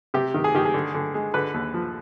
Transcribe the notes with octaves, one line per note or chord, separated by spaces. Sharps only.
C3 G4
D#3
G#4
D#3 G4
G#4
D3
D3
G#3
D3 B4
D#2
F3